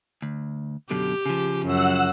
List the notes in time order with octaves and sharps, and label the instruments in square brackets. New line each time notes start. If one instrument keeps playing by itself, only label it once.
[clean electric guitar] D2
[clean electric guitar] F#2 B2 D3 [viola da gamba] G4
[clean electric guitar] C#3 F3
[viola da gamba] F#2 [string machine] F#5 E6